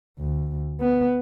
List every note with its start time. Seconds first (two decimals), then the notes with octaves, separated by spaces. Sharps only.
0.19 D2
0.81 B3